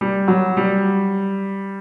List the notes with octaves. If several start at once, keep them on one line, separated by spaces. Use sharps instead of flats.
G3
F#3
G3